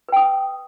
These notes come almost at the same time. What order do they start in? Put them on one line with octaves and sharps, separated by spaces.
B4 G5 D#6